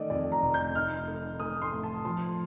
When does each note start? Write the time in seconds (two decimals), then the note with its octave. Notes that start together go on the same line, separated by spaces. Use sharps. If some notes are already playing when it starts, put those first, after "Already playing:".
Already playing: D#3 A3 D5 D#5
0.10 F2 D5
0.32 A#5
0.42 F1
0.54 G6
0.75 D#4 F6
1.08 A4
1.40 A3 D#6
1.62 C6
1.72 A2
1.83 A5
2.05 F3 C6